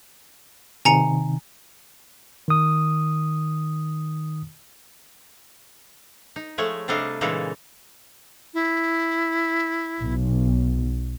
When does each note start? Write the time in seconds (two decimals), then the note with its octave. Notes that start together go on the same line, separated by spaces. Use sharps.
0.85 C3 D#3 G#5 A#5 C#7
2.48 D#3 D#6
6.36 D#4
6.58 F3 G#3 A3 C#5
6.88 C3 G3 D4 A4 D#5 F5
7.21 A#2 C#3 E3 G#3 D#4 A4
8.54 E4
10.02 B1